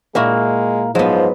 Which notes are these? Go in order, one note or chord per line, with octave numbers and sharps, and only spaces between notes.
A#2 G#3 A#3 E4 F#4
G#2 F3 F#3 B3